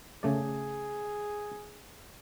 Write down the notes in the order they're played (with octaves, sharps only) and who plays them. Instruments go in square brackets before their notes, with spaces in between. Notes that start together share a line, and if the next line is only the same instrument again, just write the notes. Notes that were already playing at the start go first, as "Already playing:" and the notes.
[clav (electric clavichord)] C#3 A3 D5 [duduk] G#4